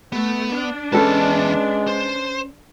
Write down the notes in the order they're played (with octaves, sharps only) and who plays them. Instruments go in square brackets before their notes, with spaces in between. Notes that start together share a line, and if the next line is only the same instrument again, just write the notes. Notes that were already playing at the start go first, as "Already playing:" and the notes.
[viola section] A3 [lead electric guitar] B3
[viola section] D4
[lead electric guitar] E2 A5 [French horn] G#3 [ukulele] C#4 A4 B4
[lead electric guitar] C5